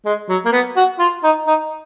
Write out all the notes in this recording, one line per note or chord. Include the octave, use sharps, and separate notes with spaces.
G#3
F#3
A#3
B3
F#4
F4
D#4
D#4